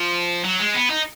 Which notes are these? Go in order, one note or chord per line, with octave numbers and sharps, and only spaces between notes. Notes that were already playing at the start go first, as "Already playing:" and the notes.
Already playing: F3
F#3
G#3
B3
D#4